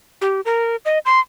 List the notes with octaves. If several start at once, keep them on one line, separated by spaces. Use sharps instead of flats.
G4
A#4
D#5
C6